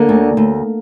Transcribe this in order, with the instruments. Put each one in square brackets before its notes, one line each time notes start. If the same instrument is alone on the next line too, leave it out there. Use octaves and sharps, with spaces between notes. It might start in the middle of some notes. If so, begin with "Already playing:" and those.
Already playing: [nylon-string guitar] D3 A#3
D2
D2